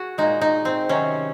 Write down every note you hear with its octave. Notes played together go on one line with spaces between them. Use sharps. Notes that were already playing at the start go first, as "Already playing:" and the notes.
Already playing: F#4 G#4
A#2 G#3 D#4
D#4
C4
C3 D#3 F#3 C#4